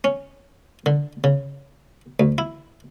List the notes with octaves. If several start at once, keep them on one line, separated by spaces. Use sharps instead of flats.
C#4
D3
C#3
D2
E4